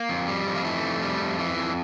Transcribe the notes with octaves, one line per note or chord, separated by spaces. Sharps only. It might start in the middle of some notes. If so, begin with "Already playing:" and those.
Already playing: A#3
F2
G3
F2
A#3
E3 A3
F2
G3
F2
E3
F2